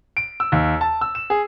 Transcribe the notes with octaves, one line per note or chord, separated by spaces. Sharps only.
D7
E6
D#2
A5
E6
E7
G#4